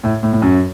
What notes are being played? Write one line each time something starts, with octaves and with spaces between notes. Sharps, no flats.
A2
A2
A2
F#2